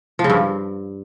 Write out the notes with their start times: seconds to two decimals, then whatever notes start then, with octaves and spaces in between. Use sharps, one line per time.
0.19 F3
0.24 C#3
0.30 G2